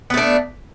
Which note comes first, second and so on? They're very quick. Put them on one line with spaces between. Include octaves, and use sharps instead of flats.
B3 A3 D4